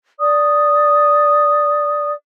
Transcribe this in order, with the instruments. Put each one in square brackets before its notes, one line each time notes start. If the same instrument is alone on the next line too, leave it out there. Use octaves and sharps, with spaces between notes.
[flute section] D5 D#6